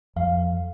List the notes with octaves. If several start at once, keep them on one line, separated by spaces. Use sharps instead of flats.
F2 F5